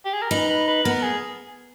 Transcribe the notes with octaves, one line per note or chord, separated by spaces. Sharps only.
G4
G#4
A#4
D#4 B4
B4
B4
B3 A#4
G#4